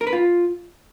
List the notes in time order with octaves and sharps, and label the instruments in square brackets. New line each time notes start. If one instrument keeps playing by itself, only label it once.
[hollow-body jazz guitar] A#4
B4
F4